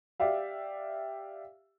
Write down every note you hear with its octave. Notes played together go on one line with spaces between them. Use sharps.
G4 D5 E5 F5